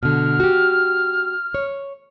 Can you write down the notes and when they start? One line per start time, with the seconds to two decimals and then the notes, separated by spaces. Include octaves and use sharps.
0.03 B2 D3 F6
0.40 F#4 G4
1.54 C#5